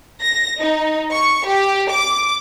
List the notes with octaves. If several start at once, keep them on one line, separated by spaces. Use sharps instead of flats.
A#6
D#4
C#6
G4
D6